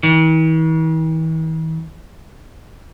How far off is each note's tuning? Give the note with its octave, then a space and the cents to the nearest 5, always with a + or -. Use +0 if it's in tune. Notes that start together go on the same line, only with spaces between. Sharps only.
E3 -45